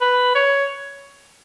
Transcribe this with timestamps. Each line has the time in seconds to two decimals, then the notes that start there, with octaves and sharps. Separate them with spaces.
0.01 B4
0.35 C#5